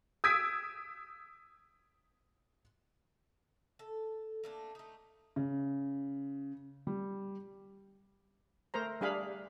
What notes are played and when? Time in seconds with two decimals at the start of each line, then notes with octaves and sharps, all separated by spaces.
0.24 D#6 E6 G#6 B6 D7
3.79 A4
4.44 A3 A#3 D4
4.75 A3 D#4
5.36 C#3
6.87 G3
8.74 A3 A#4 C5 A#5
9.01 G3 D4 G#4 F5 B5